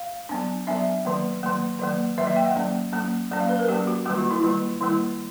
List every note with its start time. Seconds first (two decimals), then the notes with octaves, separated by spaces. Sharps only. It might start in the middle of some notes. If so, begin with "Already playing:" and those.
Already playing: F5
0.29 F#3 B3 D4
0.67 F#3 B3 D4 E5
1.05 D#3 F#3 A#3
1.43 D#3 F#3 A#3
1.79 D#3 F#3 A#3
2.18 D#3 F#3 A#3 E5
2.27 D#5
2.36 G5
2.46 F#5
2.56 F#3 A#3 C#4
2.93 F#3 A#3 C#4
3.31 F#3 A#3 C#4
3.40 F5
3.49 B4
3.59 A#4
3.68 F#3 A#3 C#4 G4
3.87 F#4
4.06 D#3 G3 A#3 F#4
4.18 F4
4.31 E4
4.42 D#3 G3 A#3 F4
4.81 D#3 G3 A#3 E4